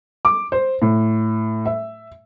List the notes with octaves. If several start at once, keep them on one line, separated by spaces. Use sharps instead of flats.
D6
C5
A2
E5